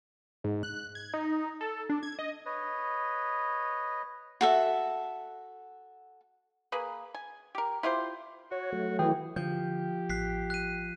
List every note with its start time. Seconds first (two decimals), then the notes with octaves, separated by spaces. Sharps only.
0.44 G#2
0.63 F#6
0.95 G#6
1.14 D#4
1.61 A4
1.89 D4
2.03 G#6
2.19 D#5
2.45 B4 C#5 D#5
4.41 F#4 A4 E5
6.72 A#3 G#4 B4
7.14 G#5
7.55 G4 A#4
7.83 E4 F4 G4 C5
8.52 F#4 C#5
8.72 F#3 A3
8.99 E3 G#4 G5
9.36 D3 F3 G4 G6
10.10 A1 F#6 B6 C7
10.50 F#6 D#7